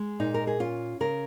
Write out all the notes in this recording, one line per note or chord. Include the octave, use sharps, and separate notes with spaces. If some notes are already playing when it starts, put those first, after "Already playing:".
Already playing: G#3
A#2 D#4
A#4
G#4
C#4 F4
C#3 A#4